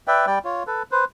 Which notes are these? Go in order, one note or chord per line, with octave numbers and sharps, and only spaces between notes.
B4 D5 E5 G5
G3 D5 G5
F4 C#5
A4 B4
B4 C5